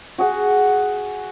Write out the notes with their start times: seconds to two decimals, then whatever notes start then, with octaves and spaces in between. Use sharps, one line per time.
0.18 F#4 G#4 F#5